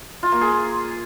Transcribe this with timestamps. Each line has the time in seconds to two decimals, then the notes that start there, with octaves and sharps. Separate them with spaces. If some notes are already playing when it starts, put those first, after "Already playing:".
0.23 F4
0.32 A#3
0.41 G#4